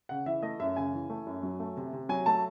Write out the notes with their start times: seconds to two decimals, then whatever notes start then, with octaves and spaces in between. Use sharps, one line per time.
0.09 C#3 F#5
0.26 E3 E5
0.43 A3 D#5
0.59 F#2 E5
0.76 C#3 G#5
0.93 E3
1.10 A3
1.26 F#2
1.43 F#3
1.60 A3
1.77 C3
1.93 C3
2.09 F#3 G#5
2.26 A3 A5